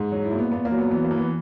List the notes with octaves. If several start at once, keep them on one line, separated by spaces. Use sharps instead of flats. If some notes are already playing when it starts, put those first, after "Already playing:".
Already playing: G#2
F#3 F#4
E4
A#2
B3
A#2 B3
A#3
F#3
B3
E3 B3
A#3
E3
B3